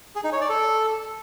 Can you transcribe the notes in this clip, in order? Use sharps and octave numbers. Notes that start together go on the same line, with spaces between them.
G#4
D#4
C#5
D5
A4